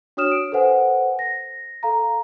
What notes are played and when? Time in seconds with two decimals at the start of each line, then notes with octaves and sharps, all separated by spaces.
0.17 D4 F#4 C#5 D#6 F6 E7
0.31 D7
0.52 A4 B4 C5 F#5 G#5
1.19 A#6
1.83 A4 F5 A#5